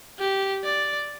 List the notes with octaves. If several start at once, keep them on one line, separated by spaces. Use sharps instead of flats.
G4
D5